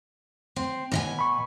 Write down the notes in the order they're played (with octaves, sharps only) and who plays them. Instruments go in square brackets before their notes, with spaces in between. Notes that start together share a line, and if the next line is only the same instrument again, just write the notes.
[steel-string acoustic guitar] C4
B2 D#5 G#5
[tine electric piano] B5 C#6